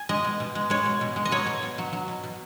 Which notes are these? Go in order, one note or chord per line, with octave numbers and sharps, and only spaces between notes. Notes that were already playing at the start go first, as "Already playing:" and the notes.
Already playing: G#5
G#3 D#5
B2
B2
G#3
G#3 C#5
B2
B2
G#3
D#5
F#3 C#5
B2
B2
F#3
F#3
B2
B2